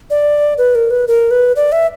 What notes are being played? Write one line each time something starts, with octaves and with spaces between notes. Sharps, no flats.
D5
B4
A#4
B4
A#4
B4
D5
E5